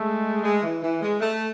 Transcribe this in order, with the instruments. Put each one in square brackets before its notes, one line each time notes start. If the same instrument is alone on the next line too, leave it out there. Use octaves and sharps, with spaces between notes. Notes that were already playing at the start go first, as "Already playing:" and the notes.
Already playing: [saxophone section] G#3 [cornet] A3
[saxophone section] G#3
E3
E3
G#3
A3